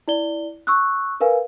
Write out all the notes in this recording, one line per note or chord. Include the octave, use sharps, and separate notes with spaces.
E4 D5 G7
C#6 E6 F#6
A#4 B4 F5 G#5